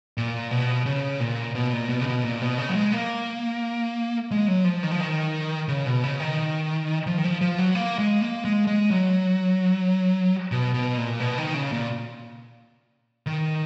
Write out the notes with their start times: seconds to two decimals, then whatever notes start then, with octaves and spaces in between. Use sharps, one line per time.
0.17 A#2
0.51 B2
0.86 C#3
1.20 A#2
1.55 B2
1.73 A#2
1.89 B2
2.01 C#3
2.06 B2
2.24 A#2
2.42 B2
2.58 C#3
2.69 F#3
2.75 G#3
2.92 A#3
4.31 G#3
4.48 F#3
4.64 F3
4.83 D#3
4.91 F3
5.00 D#3
5.68 C#3
5.86 B2
6.04 C#3
6.20 D#3
7.06 F3
7.18 D#3
7.24 F3
7.41 F3
7.58 F#3
7.75 A#3
7.99 G#3
8.21 A#3
8.45 G#3
8.67 G#3
8.90 F#3
10.52 B2
10.74 B2
10.98 A#2
11.20 B2
11.38 D#3
11.54 C#3
11.72 A#2
13.26 D#3